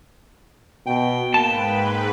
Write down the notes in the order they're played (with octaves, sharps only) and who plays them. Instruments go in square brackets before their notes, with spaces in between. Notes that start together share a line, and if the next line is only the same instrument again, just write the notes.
[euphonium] B2 [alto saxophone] G5
[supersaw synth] G#2 B4 [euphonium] A#3 [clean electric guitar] A5